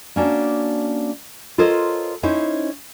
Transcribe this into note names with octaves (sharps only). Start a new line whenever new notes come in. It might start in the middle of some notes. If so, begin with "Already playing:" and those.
A#3 C#4 D4 F#4
F4 A4 A#4 C5 C#5 D#5
C#4 D#4 E4 C5